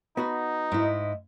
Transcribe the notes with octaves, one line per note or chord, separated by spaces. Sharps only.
B3 D#4 F#4 B4
G#2 E4 D#5